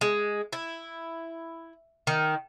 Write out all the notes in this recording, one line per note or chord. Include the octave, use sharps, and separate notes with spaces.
G#3
E4
D#3